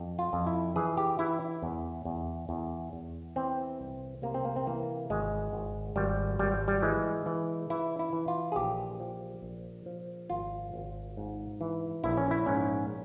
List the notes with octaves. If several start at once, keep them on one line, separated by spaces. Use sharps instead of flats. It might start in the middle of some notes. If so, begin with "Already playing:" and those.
Already playing: F2
F4
F2
E4
E3 G#4
G4
E3 E4
E2
E2
E2
E2
E3 C4
C2
C3 A#3
C4
A#3
C4
E3 A#3
G#1 G#3
G#1
G#1 G3
G#1 G3
G3
E3 G#3
E3
E3 E4
E4
E3
F4
G#4
A#1 G4
F3
A#1
F3
G#1 F4
G#1
G#2
E3
A#1 E4
C#4
E4
G#2 C#4